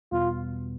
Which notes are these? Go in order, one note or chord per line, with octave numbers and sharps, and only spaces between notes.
E2 B2 G3 B3 F4